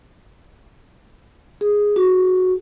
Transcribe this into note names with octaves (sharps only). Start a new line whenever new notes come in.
G#4
F#4